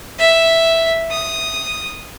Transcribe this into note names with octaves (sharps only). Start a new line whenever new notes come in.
E5
D#6